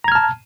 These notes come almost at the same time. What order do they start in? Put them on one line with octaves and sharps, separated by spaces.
A#5 G#6 F6 A5